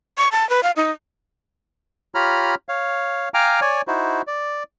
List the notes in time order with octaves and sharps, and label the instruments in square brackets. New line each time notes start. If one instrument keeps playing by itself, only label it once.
[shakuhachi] C#6
A5
B4
F5
D#4
[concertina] F4 G4 C#5 A#5 B5 F6
C#5 F5
F5 G5 G#5 A#5 D6 F6
C#5 D5 G#5
D#4 E4 F#4 C5
D5